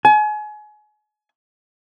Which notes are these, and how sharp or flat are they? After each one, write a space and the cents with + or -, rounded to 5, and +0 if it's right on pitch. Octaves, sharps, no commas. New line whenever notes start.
G#5 +35